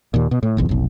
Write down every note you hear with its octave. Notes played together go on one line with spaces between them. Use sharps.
D#2 A#2
B2
A2
F#1 B1 E2
F1 B1